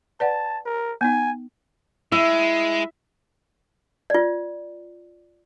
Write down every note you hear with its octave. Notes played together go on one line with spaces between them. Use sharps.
B4 D5 F#5 A5
A#4
B3 D#4 G#5
G#3 E4 E5
F4 D5